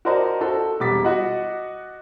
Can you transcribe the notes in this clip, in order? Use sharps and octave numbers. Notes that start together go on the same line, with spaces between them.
F#4 A#4 C5 D5 D#5 A5
F#4 A4 C5
E1 G3 D6 A6 B6
F#4 D#5 F#5